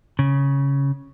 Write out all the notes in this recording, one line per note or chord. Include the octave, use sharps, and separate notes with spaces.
C#3